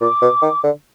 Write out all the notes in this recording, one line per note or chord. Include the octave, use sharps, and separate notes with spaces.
A#2 D6
B2
D#3
D3